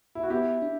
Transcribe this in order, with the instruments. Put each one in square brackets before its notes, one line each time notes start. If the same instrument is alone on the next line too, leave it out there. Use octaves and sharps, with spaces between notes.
[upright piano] E4
F#4
[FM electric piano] B3 [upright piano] E4 G4
[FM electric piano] D4